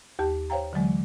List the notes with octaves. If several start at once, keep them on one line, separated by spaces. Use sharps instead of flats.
D#2 G4 A5
C5 C#5 F5 G5 A#5
D3 E3 F#3 G#3